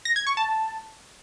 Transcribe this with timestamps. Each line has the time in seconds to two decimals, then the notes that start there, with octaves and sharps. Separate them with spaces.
0.05 A#6
0.16 G#6
0.27 C#6
0.37 A5